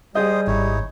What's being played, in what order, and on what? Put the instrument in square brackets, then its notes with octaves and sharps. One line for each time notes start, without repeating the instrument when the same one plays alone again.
[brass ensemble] G3 [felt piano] G#4 D#5 [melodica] C5 D#6
[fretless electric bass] G#1 [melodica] D#4 E4 C#5